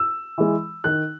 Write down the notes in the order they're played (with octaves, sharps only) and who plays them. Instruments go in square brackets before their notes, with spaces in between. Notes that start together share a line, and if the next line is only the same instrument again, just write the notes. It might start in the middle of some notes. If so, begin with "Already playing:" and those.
Already playing: [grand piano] E6
[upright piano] E3 G#3
[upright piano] D#3 [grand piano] F#6